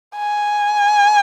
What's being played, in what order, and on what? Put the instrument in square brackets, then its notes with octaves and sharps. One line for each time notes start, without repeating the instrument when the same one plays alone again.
[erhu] G#5